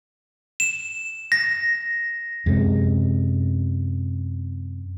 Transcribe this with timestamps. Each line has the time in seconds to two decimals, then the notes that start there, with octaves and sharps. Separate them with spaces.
0.60 E7
1.32 A#6
2.46 F#2 C3 G#3